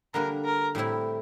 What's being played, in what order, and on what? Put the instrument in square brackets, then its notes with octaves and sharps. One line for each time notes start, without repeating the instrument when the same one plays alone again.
[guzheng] D3 G3 A#3 D4 [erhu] A#4
[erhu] A#4
[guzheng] A2 G3 C4 E4